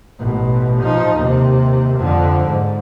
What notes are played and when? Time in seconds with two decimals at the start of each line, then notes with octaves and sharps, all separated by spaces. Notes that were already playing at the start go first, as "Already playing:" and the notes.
0.19 A1 B2
0.82 F3 D#4
1.16 D#2 C3
1.98 F2 D3
2.45 G#2